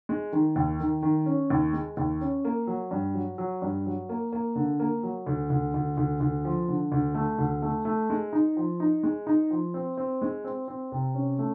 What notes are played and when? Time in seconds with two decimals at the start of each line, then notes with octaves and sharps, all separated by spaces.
0.09 G#3
0.33 D#3
0.56 D#2
0.80 D#3
1.03 D#3
1.26 C#4
1.50 D#2
1.73 G#3
1.97 D#2
2.21 C#4
2.45 A#3
2.67 F#3
2.91 G2
3.14 F#3
3.38 F#3
3.62 G2
3.86 F#3
4.09 A#3
4.33 A#3
4.56 D3
4.80 A#3
5.03 F#3
5.26 D2
5.50 D2
5.74 D2
5.97 D2
6.20 D2
6.45 F3
6.68 D3
6.92 D2
7.15 A3
7.38 D2
7.62 A3
7.85 A3
8.10 G#3
8.33 D#4
8.57 F3
8.80 D#4
9.03 G#3
9.27 D#4
9.51 F3
9.74 C4
9.97 C4
10.22 G#3
10.44 C4
10.68 C4
10.92 C3
11.15 C#4
11.39 A3